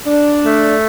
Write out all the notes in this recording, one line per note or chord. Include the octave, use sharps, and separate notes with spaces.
D4
A3